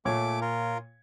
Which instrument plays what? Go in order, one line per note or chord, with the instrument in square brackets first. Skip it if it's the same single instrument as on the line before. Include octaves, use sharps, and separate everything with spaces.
[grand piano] A#2 C#5 G#6 [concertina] A3 D6
[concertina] F4 A#4